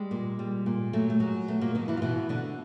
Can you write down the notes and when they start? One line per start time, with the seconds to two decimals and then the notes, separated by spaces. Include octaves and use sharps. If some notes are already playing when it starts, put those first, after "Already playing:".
Already playing: G3 G#3
0.11 A#2
0.39 G3
0.66 A#2
0.93 F#3 A3
1.10 A3
1.20 F#3 G#3
1.48 B2 A3
1.61 A#2 A#3
1.75 B2 D#3 D#4
1.88 E3 E4
1.97 F4
2.02 B2 E3 E4
2.29 B2 D3 D4